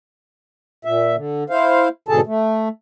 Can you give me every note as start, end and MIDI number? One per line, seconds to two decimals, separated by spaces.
0.85 1.16 46
0.85 1.16 76
1.16 1.44 50
1.50 1.88 64
1.50 1.88 72
1.50 1.88 77
2.09 2.21 44
2.09 2.21 47
2.09 2.21 50
2.09 2.21 68
2.09 2.21 69
2.09 2.21 81
2.27 2.69 57